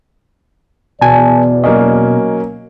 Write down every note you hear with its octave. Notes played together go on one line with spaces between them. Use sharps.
E2 B2 D5 G#5 A5
F#3 A#3 C#4 D#5